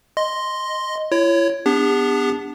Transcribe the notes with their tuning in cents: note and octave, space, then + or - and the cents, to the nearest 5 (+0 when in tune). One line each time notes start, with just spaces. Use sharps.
D#5 +0 C6 +0
E4 +40 C#5 +0
B3 +5 D4 +0 G4 +45